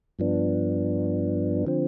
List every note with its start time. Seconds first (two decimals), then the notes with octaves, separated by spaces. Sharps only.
0.19 G2 F3 B3 D4
1.66 D3 F3 C4